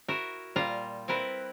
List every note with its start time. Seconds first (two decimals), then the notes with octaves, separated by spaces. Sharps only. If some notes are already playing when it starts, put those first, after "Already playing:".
0.08 E4 F#4 A#4 E5
0.56 A#2 G3 F4 F5 A#5
1.08 C4 E4 A#4 B4